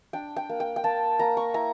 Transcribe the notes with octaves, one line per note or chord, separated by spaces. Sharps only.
D4 G5
G5
A#3
G5
G5
A#3 A5
A#3 A#5
C#6
E4 A#5